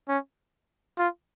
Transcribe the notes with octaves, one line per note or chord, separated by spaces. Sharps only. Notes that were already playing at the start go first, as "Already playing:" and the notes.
C#4
F4